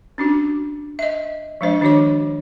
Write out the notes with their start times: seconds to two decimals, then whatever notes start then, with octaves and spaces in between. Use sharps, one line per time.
0.18 C#4 D4 F#4
0.99 D#5 E5
1.61 F3 G#3 D4 C5 D#5
1.81 D#3 D4 F#4 C#5 D6